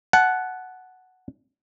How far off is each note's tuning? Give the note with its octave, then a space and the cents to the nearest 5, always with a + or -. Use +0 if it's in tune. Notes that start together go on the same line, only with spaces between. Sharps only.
F#5 +0 A5 -25